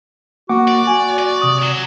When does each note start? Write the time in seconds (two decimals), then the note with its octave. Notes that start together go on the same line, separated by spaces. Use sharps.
0.49 A#3 F#4 F#5 D6
0.68 D5
0.87 F#4 G#5
1.19 D5
1.42 C3 D#6
1.62 F#3